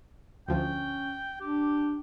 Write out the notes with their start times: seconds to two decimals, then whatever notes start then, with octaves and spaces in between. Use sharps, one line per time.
0.48 D2 F3 C#4 G5
1.40 D4 G4